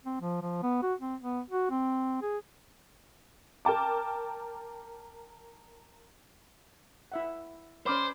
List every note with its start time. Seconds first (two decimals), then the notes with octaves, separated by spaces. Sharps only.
0.06 C4
0.21 F3
0.42 F3
0.63 B3
0.82 F#4
1.01 C4
1.21 B3
1.50 F#4
1.71 C4
2.22 G#4
3.65 A#4 G5 A5 D6
7.12 E4 E5 F#5
7.86 C#4 C5 D5 B5 C6 D6 F6